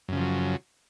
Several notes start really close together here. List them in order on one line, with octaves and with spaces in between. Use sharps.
F#2 C#3 F3 F#3